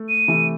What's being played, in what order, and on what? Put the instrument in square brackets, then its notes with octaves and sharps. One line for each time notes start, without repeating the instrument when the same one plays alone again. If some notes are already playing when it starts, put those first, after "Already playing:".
Already playing: [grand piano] A3
[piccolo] D#7
[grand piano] C3 E3 A3